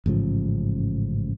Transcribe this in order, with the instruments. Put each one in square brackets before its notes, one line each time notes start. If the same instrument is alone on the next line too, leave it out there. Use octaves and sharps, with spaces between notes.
[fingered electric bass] A1 G#2 C#3 F3